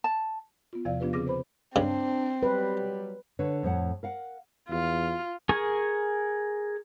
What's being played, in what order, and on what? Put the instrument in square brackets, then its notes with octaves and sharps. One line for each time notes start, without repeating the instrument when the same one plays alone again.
[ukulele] A5
[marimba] B3 F4
E2 C3 F3 E4 D5 F5
F3 B3 D4 F4 G4 B4
C#3 C4 G#4 D6 A#6
B4 C5 B5
[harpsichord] G2 C#3 [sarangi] C4 [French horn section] D4
[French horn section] F#3 G3 [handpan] B4
[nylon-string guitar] D3 B4 C#5
F2 A2 C#5 F#5 A5
A#4 F5 F#5
[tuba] E2 [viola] F4
[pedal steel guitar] G#4 A#4 G#5 C#6